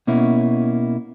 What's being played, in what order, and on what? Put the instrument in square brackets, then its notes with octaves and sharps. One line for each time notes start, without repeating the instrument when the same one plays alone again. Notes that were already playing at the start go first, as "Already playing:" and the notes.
[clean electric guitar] B2 A#3 C#4 E4